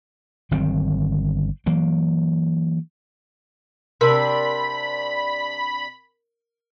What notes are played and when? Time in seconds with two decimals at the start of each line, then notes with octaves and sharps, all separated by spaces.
0.51 G1 D#3 F#3 C4
1.66 E3 F#3 A#3
4.01 C3 D4 A#4 B5 E6